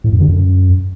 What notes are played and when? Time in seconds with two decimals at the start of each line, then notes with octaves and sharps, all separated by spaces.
0.04 A2
0.12 F#2
0.20 D3
0.28 F#2